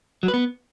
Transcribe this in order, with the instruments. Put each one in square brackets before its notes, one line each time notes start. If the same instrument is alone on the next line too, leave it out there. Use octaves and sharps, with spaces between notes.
[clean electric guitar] F#3
B4
B3